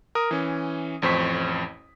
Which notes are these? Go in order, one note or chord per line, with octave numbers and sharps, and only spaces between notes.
A#4 D#6
E3 C#4
A1 F2 C5 C#6 B6